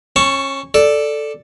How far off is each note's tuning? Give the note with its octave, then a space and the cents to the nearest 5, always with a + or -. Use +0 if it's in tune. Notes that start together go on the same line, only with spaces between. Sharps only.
C#4 -25 A5 +0 C#6 +0
A4 +0 D5 +0